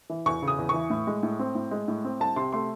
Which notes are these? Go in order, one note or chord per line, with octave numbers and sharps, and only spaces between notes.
E3
E2 C#6
C#3
D#6
E2
E3 C#6
A2
G#3
A2
C4
A2
G#3
A2
C4
C2 A5
C3 C6
A3 C6